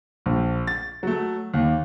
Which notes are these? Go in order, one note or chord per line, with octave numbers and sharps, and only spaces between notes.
A#1
A6
F#3 A3
D#2